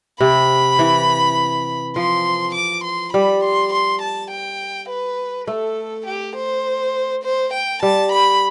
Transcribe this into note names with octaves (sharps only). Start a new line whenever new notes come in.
C3 B5
E3
F3 C6
D6
C6
G3 B5
C6
C6
A5
G5
B4
A3 A4
G4
C5
C5
G5
G3 A5
B5